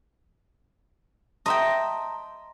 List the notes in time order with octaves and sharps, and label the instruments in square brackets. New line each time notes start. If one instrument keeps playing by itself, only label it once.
[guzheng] D#5 E5 G5 [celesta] A5 A#5 C6